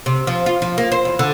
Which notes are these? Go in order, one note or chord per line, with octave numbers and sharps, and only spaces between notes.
C3
F3
F4
F3
A#3
C5
E2
D3